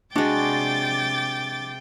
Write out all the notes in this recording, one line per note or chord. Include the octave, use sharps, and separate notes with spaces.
C3 G#3 D4 F#4 G5 D6 A6